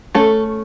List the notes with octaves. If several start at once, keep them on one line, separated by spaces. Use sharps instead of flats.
A3 C#4 A4